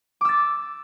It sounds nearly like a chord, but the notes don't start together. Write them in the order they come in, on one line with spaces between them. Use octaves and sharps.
D6 E6 A6